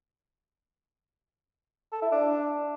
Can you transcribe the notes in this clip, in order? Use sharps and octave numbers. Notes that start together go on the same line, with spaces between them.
A4
E4
D4